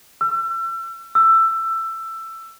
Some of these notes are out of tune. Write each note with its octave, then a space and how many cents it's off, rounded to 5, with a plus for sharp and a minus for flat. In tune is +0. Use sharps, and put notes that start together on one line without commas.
E6 +35
E6 +15